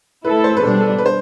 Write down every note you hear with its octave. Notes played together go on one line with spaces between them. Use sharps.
A3 E4 A4 B4
C5
B4
B2 G3 D4 A4
A4
B4
C5